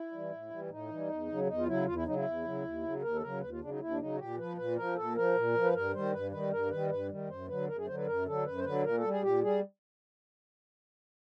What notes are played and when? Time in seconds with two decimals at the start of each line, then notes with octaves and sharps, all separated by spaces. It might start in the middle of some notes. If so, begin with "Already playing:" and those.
Already playing: E4
0.12 E3 G3
0.30 A2
0.50 E3 G3
0.70 A2 D#4
0.89 E3 G3
1.09 E2
1.29 C#3 F#3
1.47 E2 D#4
1.58 F4
1.66 C#3 F#3 E4
1.86 E2 F4
1.95 E4
2.06 C#3 F#3 D#4
2.16 E4
2.25 E2
2.44 C#3 F#3
2.64 D#2
2.83 C#3 F#3
3.02 D#2 A#4
3.14 A4
3.21 C#3 F#3 A#4
3.41 D#2 B4
3.51 F4
3.60 C#3 F#3 D4
3.71 D#4
3.80 D#2 E4
3.90 D4
3.99 C#3 F#3 D#4
4.14 F#4
4.18 A#2 G4
4.38 F3 B4
4.57 A#2 B4
4.77 F3 A#4
4.96 A#2 A4
5.16 F3 A#4
5.35 A#2
5.54 F3
5.63 B4
5.73 G2 A#4
5.93 D#3 G3 C5
6.13 G2 B4
6.31 D#3 G3 B4
6.51 G2 A#4
6.70 D#3 G3 B4
6.90 G2 B4
7.09 D#3 G3
7.29 F#2 C5
7.48 D3 F#3 B4
7.68 F#2 A#4
7.77 G#4
7.87 D3 F#3 C5
7.97 B4
8.06 F#2 A#4
8.26 D3 F#3 A4
8.45 F#2 B4
8.58 C5
8.64 D3 F#3 B4
8.84 A#2 A#4
8.97 A4
9.03 G3
9.10 G#4
9.22 A#2 G4
9.42 G3 G#4